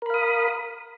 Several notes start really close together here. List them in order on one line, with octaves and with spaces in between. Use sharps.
A#4 B5 F5 D#6